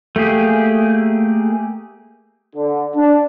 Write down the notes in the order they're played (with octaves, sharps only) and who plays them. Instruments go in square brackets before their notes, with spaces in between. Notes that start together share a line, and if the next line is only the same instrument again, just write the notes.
[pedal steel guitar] A3 A#3 G4 G#4
[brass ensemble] D3
D4